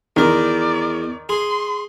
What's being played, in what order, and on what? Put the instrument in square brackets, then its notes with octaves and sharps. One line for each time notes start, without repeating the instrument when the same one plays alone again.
[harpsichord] E2 A#4 [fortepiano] D#3 [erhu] D5
[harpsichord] G#4 [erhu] C6